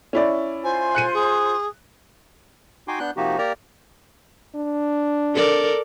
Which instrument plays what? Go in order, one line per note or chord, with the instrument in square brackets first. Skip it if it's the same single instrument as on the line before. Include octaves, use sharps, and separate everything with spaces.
[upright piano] C#4 E4 D5
[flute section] F4 C5 C6 [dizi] G#5
[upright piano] F#6 C#7 D#7
[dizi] G#4
[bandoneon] D#4 F#4 G5 G#5 C6 D6
B3 D4 F#6 G6
C3 F3 A#3 D#4 F#4 G4
A#3 G4 A#4 D5 A#5
[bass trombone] D4
[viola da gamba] A4 A#4 D5